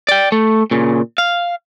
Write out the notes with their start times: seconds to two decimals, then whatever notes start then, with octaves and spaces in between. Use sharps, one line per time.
0.09 D5 G5
0.32 A3
0.71 A#2 C#3
1.18 F5